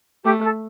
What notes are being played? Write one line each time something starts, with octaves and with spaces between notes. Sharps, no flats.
A3 G4
A4